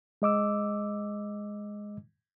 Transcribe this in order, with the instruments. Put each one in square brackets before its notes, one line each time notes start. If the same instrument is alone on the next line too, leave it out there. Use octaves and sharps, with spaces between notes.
[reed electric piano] G#3 D#5 D6 E6